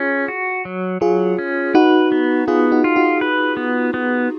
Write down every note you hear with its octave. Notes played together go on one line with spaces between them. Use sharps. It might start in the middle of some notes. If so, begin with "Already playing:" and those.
Already playing: C#4 F4 G#4
F#4
F#3
F#3 F4 G#4
C#4
D#4 F#4 B4
B3
B3 F4 G#4
D#4 F#4
F4
D#4 F#4
B4
B3
B3